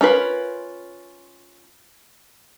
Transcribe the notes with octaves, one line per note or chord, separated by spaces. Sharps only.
C#4 F4 A#4 B4